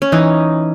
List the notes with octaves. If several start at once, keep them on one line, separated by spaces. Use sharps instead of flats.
C#4
E3 D#4